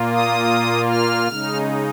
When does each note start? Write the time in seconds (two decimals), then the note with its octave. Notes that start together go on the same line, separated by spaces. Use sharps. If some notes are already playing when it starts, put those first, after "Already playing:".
Already playing: A#2 A#3 F4
0.13 D#6
0.89 F6
1.27 C#3 G#3 D#4